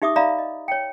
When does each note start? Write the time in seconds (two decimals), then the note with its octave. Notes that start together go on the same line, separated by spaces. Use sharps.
0.02 D#4 G4 E5 D6 D#6
0.16 D5 E5 F5 A#5 B5
0.38 D#5
0.68 C#5 G5